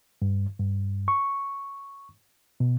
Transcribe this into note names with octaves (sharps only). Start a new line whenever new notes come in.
G2
G2
C#6
B2